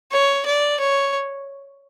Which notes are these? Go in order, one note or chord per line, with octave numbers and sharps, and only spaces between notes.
C#5
D5
C#5